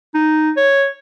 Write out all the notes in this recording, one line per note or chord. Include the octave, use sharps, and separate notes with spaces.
D#4
C#5